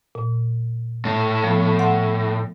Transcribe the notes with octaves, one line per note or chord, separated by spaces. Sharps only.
A#2
A2
F3 B3
F#5 C6